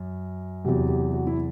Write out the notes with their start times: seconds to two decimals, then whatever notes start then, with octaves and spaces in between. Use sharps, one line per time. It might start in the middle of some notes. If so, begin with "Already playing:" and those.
Already playing: F#2
0.64 E2 C3 F#3 G4
0.89 G4
1.13 F#4
1.27 E4